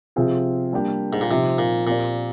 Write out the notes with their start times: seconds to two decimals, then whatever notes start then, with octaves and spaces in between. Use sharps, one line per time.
0.16 C3 F3 C4 F4 G#4
0.73 G3 A#3 D4 G4
1.13 G#2
1.21 A#2
1.30 C3 F3 C4 D#4
1.58 A#2
1.87 A#2 C4 G4 A#4 D5